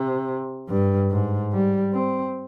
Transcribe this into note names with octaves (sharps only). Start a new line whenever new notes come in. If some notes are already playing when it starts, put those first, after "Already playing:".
Already playing: C3
G2
G#2
G3
C4